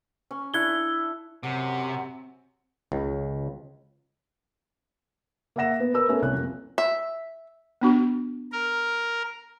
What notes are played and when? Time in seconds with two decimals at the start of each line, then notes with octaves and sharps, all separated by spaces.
0.31 C#4
0.54 D4 E4 A4 F#6 G#6 G7
1.43 F#2 C3 C4 F#5
2.92 C#2 C#3
5.56 A#3 A#4 E5 F#5 A#6 E7
5.80 B3
5.94 A#4 B4 E6
6.08 A3 B3 C#4 A4 A#4
6.22 C2 C#4 F#6
6.34 F2 A#3
6.78 E5
7.81 B3 D4 F#4
8.52 A#4